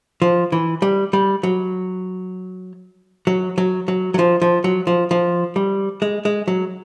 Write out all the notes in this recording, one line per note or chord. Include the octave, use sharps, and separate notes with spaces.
F3
E3
G3
G3
F#3
F#3
F#3
F#3
F#3
F3
F3
F#3
F3
F3
G3
G#3
G#3
F#3